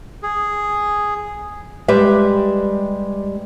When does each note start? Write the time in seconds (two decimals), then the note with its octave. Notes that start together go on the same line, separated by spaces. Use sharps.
0.23 G#4
1.88 G3 G#3 G4 B4 E5